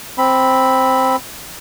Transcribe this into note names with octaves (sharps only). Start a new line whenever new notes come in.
C4 B5